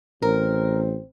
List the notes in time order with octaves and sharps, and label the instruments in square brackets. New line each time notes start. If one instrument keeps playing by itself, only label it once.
[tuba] A1 [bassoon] C4 [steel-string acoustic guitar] A#4